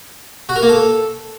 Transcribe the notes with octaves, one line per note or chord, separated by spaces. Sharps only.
F#4
A#4
A#3
A4